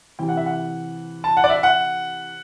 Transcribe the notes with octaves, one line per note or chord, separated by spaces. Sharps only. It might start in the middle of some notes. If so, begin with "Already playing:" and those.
C3 E3 G5
F#5
E5
F#5
A5
F#5
D5
E5
F#5